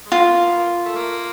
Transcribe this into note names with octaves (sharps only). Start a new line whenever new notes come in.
G#3
A3 F4
A#3
A#3
B3
A#3
A3
A#3